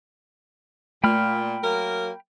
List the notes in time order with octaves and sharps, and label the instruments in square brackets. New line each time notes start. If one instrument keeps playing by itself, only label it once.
[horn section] A#2 [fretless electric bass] A3 [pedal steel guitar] G5 B5 F6
[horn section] F#3 A#3 A#4